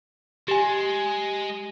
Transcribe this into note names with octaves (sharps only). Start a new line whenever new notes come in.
G#3 G4 G#5